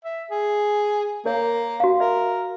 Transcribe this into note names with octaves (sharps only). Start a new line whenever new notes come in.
E5
G#4
A#3 A#4 C#5
F#4 F5
A#4 E5